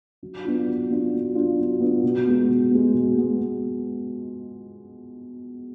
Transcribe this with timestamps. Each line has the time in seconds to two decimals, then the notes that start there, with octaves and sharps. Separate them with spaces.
0.23 F#3
0.45 B3 D4 F4
0.67 F#3
0.90 B3 D4 F4
1.13 F#3
1.35 B3 D4 F4
1.58 F#3
1.80 B3 D4 F4
2.03 B2
2.26 G#3 B3
2.48 B2
2.71 G#3 B3
2.93 B2
3.16 G#3 B3